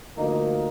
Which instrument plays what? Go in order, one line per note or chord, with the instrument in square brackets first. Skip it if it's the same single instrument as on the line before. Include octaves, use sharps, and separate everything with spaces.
[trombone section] D2 D3 F3 A#3 D#4